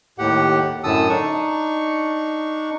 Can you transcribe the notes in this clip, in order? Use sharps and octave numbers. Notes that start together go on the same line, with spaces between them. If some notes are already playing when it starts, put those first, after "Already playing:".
D#2 A2 G4 F#5
F#2 A2 D3 A5 D#6 E6
D4 D#4 C#6